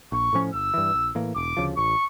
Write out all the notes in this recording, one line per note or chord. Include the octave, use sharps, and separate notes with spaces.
A#1 C#6
A2 F3 C#4
G1 E6
G2 E3
A#1
A2 E3 A#3
E1 D6
D2 C#3 F3
A1 C#6